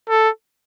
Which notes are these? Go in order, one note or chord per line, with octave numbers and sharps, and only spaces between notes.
A4